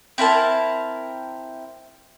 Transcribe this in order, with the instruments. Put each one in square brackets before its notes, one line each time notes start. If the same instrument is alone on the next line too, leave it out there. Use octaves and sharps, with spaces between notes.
[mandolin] C4 E4 A#4 A5